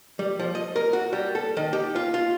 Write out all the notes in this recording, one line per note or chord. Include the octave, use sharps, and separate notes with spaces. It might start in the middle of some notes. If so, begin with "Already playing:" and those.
G3
F3
D#5
A#4
F#4
G3
A4
D#3
G4
F4
F4